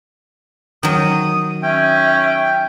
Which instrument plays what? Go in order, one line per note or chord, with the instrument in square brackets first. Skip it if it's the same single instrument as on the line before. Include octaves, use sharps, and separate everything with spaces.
[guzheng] D#3 F#3 [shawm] D#6
[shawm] C#4 [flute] E5 [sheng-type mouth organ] G5